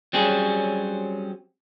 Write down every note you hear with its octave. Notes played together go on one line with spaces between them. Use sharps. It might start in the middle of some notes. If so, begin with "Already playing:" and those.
F#3 G3 C4 C#4 G#4